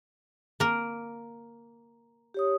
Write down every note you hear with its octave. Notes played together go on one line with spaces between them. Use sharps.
A#3 A#4
G4 C#5 D#6